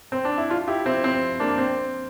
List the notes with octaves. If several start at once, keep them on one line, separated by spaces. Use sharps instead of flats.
C4
D4
E4
D4 F4
E4 G4
C4 E4
C4
A#3 D4
C4